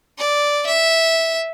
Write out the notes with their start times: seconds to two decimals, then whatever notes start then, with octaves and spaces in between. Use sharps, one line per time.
0.18 D5
0.66 E5